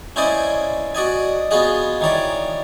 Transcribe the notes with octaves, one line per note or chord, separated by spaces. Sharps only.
C#4 E4 C5 D5 D#5 G#5
F#4 D5 D#5 G#5
B3 F4 F#4 G#4 D#5
D#3 E3 C#5 D5